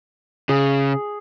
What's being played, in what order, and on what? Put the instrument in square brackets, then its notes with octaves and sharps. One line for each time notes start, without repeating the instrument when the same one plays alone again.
[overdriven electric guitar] C#3 [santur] G#4